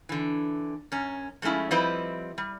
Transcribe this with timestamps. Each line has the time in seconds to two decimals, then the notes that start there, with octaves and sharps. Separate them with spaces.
0.09 D3 E3
0.92 F#2 C#4
1.42 F3 G#3 A3 C#4 E4
1.71 F3 G3 C4 E4 B4 D#5
2.38 G3